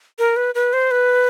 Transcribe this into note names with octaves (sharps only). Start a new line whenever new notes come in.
A#4
B4
B4
C5
B4